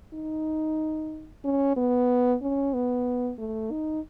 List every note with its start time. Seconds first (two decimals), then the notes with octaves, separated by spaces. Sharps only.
0.14 D#4
1.44 C#4
1.77 B3
2.42 C#4
2.74 B3
3.39 A3
3.71 D#4